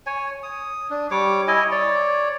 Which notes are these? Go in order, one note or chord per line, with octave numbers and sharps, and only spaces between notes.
C#5 G#5
D#6
D4
G3 C#5 D6
E4 D#5 G#5
C#5 D5